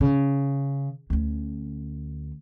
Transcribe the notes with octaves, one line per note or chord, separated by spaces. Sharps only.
C#3
D2 C#4